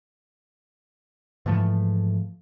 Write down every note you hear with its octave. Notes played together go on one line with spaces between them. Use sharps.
G#2 E3 F3 A3